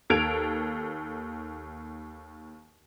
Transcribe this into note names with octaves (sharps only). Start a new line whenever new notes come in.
D#2 A4 G#6 D7 F7